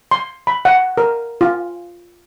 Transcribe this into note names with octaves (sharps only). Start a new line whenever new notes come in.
C6
B5
F#5
A#4
F4